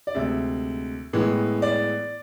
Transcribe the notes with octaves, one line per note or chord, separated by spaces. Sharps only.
D5
D2 C3 G#3 E5
A2 E3 G#3 B3
D5